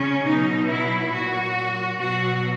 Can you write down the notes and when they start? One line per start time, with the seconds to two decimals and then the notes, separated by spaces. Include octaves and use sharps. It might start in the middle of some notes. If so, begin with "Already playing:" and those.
Already playing: C#3 C#4
0.25 B2 F#3 D#4
0.69 E4
1.12 A#2 F#3 F#4
1.98 B2 F#3 F#4